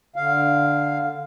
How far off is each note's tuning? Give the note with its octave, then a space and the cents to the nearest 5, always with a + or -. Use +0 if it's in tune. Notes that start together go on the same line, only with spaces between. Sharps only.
D3 +0 F5 +0